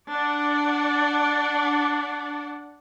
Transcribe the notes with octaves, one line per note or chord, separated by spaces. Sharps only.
D4 D5 F#5